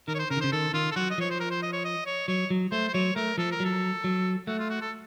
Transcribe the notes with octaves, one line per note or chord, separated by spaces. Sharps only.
D#3 A#4
C#5
C5
C#3 A#4
D#3
C#3 C5
D#3 A4
D#3 F4
A4
F#3 F#4
D#5
F3 C#5
C5
A#4
C5
D#5
C#5
D#5
C#5
F#3 C#5
F#3
A3 C5
C5
F#3 C#5
A3 A#4
F3 A4
A#4
F#3 A4
F#3
A3 F#4
F4
F#4
A4